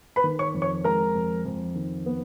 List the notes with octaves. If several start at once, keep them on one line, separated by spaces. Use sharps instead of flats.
B4 B5
D#3
C#5 C#6
F2
C#5 C#6
G#3 A#4 A#5
F2
F2
D#3
B3